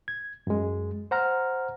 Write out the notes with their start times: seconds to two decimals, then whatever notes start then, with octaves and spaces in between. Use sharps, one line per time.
0.08 G#6
0.47 F#2 G#3
1.11 C5 F#5 A#5 F6